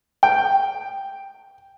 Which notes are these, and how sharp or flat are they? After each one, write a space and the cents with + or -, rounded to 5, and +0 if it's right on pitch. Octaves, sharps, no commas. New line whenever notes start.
G5 +0